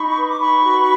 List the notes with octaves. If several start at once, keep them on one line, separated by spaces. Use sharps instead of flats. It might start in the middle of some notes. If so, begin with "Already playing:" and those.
Already playing: D#4 B5 C#6
B4
D6
D#4 B5 C#6
F#4